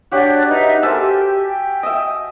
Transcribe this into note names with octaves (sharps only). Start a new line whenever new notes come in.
D4 F#4 G4 C#5 F#5
D#4 B4 E5
A4 A#4 C5 E5 G#5 A5
G4
G5
D#5 E5